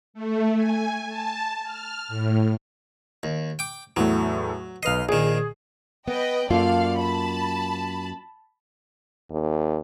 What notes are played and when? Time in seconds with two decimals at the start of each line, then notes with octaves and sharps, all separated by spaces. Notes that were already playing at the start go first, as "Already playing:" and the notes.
0.14 A3
0.55 G#5
1.08 A5
1.64 F6
2.08 A2
3.23 D#2
3.59 G5 D6
3.96 E2 A2 F#3 A3
4.83 B1 B4 D#5 F5 C7
5.09 A#1 D#3 G#4
6.08 B3 B4 D#5 G5
6.50 F#2 A#3 F4 A4 D5 F5
6.98 A5 B5
9.31 D#2